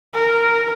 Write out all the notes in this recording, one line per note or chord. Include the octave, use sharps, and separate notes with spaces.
A#4